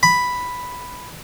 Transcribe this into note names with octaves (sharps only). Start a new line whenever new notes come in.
B5